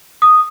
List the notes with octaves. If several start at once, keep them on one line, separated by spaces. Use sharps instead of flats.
D#6